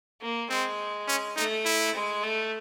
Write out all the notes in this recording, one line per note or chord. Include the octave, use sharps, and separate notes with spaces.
A#3
G#3 C4
C#4
A3 D#4
E4
G#3
A3